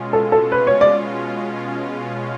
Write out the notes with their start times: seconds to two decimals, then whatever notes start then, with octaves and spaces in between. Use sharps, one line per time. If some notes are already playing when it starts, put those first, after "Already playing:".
Already playing: B2 G#3 C#4 F4
0.13 A4
0.32 A4
0.52 B2 G#3 C#4 F4 B4
0.67 C#5
0.81 D5